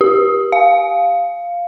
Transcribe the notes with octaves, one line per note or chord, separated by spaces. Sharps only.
G4
F5